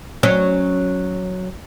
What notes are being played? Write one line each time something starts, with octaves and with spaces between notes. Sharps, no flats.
F#3 C#4